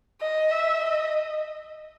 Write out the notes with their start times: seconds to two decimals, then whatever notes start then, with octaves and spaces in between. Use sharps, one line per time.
0.21 D#5
0.51 E5
0.80 D#5